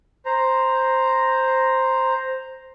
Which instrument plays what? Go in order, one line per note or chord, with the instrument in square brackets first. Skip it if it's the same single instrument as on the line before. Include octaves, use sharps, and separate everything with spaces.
[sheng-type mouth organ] C5 A#5